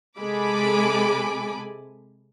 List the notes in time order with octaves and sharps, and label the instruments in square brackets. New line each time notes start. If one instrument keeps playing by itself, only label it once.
[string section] C3 G#3 A4 G#5 B5 D6